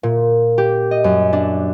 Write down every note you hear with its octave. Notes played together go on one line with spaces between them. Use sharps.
A#2
G4
D#5
F#2
D4